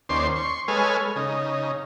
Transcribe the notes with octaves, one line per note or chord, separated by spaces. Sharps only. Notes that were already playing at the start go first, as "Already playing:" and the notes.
D#2 C#4 C5 D5 C6
C6 C#6
G#3 A4 B4 C#5 G#5 F6
C#3 D#4